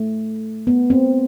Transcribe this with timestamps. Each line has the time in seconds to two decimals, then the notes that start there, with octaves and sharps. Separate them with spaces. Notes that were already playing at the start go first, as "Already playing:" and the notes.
Already playing: A3
0.67 B3
0.90 C4